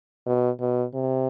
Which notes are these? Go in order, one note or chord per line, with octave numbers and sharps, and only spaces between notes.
B2
B2
C3